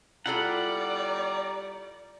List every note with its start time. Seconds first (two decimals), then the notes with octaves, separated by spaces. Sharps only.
0.26 G3 E4 F4 A4 D5 F#5 A#5